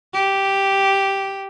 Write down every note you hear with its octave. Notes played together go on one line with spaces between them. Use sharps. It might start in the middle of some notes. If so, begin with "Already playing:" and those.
G4